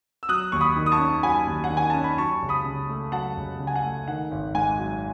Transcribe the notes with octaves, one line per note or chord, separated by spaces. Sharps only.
E6
F#3 D#6 F#6
D#2 C#6
B5 D#6
D#3
D#6
A5 C#6
C#4
F#3 G#5 B5
D#2
F#5
D#3
G#5
C#4 A5
B5
F#3 A5 C#6
C#2
B5 D#6
C#3
A3
F#3 F#5 A5
C#2
C#3
G#5
F#5
A3
D#3 F#5
G#1
G#2 G#5
F#3